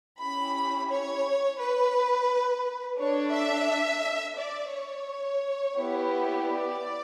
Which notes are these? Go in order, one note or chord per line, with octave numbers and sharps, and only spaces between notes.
C#4 E4 G4 B5
C#5
B4
D4 A4 C#5
E5
D5
C#5
B3 E4 G4
D5